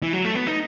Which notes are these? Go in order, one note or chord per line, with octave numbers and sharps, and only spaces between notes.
E3
F#3
A3
B3
D#4